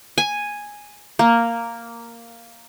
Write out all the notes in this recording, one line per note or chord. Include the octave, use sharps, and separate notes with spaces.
G#5
A#3